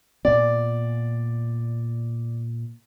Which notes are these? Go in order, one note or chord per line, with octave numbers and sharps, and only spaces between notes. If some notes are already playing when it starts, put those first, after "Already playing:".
A#2 B3 D5